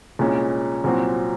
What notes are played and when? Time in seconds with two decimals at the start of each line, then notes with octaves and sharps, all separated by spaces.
0.19 C2 A#2 G#3 C#4
0.84 C2 A#2 F#3 C4 F#4